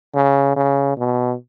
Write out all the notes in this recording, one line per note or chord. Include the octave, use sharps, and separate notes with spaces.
C#3
C#3
B2